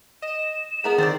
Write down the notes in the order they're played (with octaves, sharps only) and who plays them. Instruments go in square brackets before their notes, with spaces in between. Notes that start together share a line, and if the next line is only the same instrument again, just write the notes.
[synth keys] D#5 [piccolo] E7
[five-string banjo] B3 A#4 B5 [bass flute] G#4
[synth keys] D#3 [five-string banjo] C4 C5 D5 [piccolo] A6